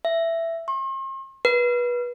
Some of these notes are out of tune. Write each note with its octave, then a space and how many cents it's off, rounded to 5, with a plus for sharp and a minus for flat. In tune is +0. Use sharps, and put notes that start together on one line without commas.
E5 +10
C6 +45
B4 -25